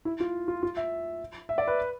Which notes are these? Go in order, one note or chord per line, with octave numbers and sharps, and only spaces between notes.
E4
F4
F4
F4
E5
E5
D5
B4